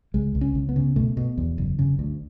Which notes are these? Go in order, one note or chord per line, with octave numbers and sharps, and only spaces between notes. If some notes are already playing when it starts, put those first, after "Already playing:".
C#2 G#3
C#2
C#4
C#2
B3
C#3
B2 A3
B2
E2
F#1
C#3
D2